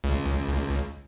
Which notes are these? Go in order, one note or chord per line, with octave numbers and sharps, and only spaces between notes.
C#2